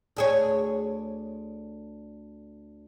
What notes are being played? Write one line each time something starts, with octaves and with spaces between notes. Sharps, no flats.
D2 G#4 C#5